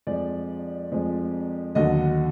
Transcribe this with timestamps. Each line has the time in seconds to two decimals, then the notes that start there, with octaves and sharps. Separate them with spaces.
0.07 F2 F3 G#3 D5
0.92 F2 F3 G#3
1.75 D#2 D3 F#3 D#5